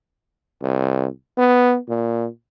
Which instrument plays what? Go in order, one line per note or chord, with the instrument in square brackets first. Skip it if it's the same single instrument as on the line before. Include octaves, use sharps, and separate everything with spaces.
[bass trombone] C2
B3
A#2